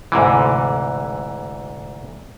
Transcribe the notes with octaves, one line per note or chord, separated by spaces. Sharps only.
D2 G#2 C3 E3